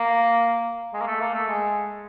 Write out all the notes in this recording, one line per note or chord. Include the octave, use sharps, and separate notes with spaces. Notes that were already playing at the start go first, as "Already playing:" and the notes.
Already playing: A#3
G#3
A#3
A3
A#3
A3
G#3